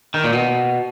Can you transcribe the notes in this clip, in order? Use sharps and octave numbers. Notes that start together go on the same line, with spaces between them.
D#3
A#2
B2